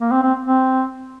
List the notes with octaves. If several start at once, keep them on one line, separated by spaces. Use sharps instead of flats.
A#3
C4
C4
C4